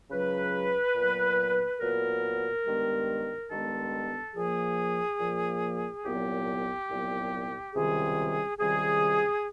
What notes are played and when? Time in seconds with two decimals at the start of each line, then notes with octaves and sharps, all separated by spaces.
0.10 C#2 C#3 F#3 B4
0.95 A#2 F#3 B3
1.79 A#2 F#3 B3 A#4
2.64 G2 D#3 G#3 B3
3.49 G2 D#3 G#3 B3 A4
4.34 A#2 F3 A#3 G#4
5.19 A#2 F3 A#3
6.03 C2 A#2 F#3 B3 G4
6.88 C2 A#2 F#3 B3
7.73 C#2 C3 D#3 G3 G#4
8.58 C#2 C3 D#3 G3 G#4